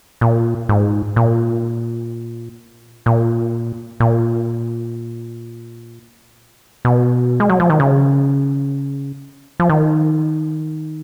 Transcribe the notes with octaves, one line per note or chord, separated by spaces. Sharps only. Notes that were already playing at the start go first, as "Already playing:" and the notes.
A#2
G#2
A#2
A#2
A#2
B2
G#3
F#3
F3
D#3
C#3
F3
D#3